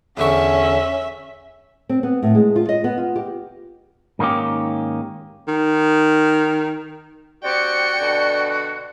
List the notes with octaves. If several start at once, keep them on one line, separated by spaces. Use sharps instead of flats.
E2 D3 C#4 E5 C#6
C4
B3
A2
G#3
F4
D#5
B3
F4
G4
G#2 D#3 A#3 C#4 G4
D#3
C4 D4 F#4 G4 D5 G5 C#7
B2 D3 D4